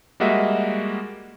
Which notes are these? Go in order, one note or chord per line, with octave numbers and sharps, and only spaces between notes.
G3 G#3 A#3 F#4 D#5 E5